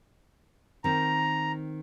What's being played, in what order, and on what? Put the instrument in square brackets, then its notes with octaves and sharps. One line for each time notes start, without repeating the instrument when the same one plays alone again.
[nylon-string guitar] D#3 C4 [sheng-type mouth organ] A#5